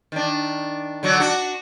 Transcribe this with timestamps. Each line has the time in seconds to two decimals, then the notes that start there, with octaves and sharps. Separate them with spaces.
0.12 D#3 D4
1.03 D3 F#3 F#4
1.20 D4 F#4